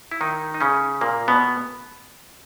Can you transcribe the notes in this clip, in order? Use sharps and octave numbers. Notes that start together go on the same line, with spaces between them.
E4
D#3 D#4
D#4
C#3 C#4
A#2 A#3
B2 B3